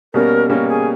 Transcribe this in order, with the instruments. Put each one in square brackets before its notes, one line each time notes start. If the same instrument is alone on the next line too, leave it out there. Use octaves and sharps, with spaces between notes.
[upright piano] B2 G3 A#3 C#4 [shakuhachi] A#4
[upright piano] B2 G3 A#3 C#4 [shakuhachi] A#4
[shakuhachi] G#4